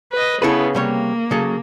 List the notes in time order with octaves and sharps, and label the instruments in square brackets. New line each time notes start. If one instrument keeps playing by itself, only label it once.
[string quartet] B4 D#5
[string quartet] C#3 B3 [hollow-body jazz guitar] E4 A4 B4
[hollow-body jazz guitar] C3 G3 C#5 [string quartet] A#3
[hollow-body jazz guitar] C#3 F#3 A4